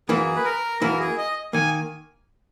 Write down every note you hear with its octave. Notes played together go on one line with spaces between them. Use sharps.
F#2 E3 A#3 E4 G#4
B4
A#4
F#2 E3 A#3 E4 A#4
G#4
D#5
D#3 A#3 G#5